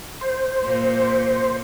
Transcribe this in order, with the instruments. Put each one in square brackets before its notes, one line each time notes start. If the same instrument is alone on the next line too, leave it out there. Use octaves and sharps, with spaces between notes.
[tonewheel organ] C5
[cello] A#2